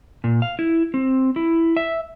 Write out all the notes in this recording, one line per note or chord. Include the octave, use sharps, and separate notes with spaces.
A#2
F5
E4
C4
E4
E5